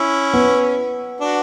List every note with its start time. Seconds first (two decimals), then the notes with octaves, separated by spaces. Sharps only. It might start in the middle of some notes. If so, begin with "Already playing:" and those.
Already playing: C#4 E4
0.33 B3
1.20 D4 F#4